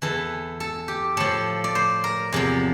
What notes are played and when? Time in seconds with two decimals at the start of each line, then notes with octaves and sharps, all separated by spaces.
0.02 E2 E3 A4
0.60 A4
0.88 G4
1.17 A2 F3 A4
1.64 D5
1.75 C5
2.04 A#4
2.33 E2 C3 F3